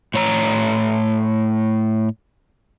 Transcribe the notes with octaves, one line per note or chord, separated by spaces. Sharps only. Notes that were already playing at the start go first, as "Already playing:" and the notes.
A2 C#5 A#5